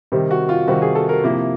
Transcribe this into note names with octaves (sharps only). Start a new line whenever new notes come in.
C3 D#3 G3 C4
F#4
F4
C3 D#3 G3 C4 F#4
G#4
A4
A#4
C3 F3 A#3 E4